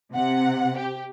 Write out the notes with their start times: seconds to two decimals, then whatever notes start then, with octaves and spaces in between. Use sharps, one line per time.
0.13 C3 F#5
0.78 G4